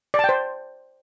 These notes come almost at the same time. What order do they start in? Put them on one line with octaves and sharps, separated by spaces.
D5 A5 G5 C5